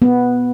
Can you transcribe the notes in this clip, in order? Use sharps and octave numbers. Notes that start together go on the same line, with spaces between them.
B3